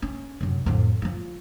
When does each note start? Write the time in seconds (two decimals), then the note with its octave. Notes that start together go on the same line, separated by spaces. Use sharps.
0.02 C#4
0.41 F#2 C3
0.66 F2 A2
1.02 F3 F4